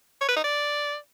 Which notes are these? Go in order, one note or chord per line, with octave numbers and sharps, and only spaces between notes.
C#5
B4
D#4
D5